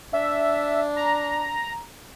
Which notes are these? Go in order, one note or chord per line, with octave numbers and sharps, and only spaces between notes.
D4 E5
A#5